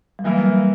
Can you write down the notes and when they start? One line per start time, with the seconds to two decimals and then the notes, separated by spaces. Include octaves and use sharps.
0.19 G3
0.24 E3 F#3 A#3 E4 A#4
0.46 G3